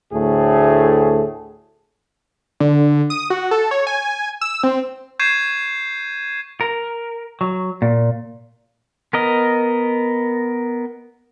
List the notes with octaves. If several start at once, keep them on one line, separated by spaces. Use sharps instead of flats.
D2 A2 A3 G#4
D3
D#6
F#4
A4
C#5
G#5
E6
C4
C#6 G6 G#6 C7 D#7 E7
A#4
F#3
A#2
B3 A#4 D#5